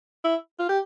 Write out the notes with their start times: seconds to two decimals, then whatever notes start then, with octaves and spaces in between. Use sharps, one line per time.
0.25 E4
0.59 F4
0.69 G4